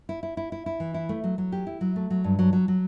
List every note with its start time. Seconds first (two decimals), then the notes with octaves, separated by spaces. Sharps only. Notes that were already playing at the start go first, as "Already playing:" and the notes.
0.09 E4
0.23 E4
0.37 E4
0.52 E4
0.66 E4
0.80 E3
0.94 E4
1.09 A3
1.24 F#3
1.38 F#3
1.52 G4
1.67 E4
1.81 F#3
1.96 A3
2.10 F#3
2.24 G2
2.39 F#3
2.53 F#3
2.68 F#3